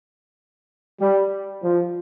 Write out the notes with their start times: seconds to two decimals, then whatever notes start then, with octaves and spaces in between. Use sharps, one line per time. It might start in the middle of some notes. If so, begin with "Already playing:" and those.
1.00 G3
1.62 F3